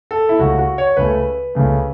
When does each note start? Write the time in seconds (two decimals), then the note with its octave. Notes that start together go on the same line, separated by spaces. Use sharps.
0.11 A4
0.29 E4
0.39 C#2 C#3 A3 F#4
0.59 F#4
0.78 C#5
0.97 C#2 C#3 A3 B4
1.55 C#2 C#3 A3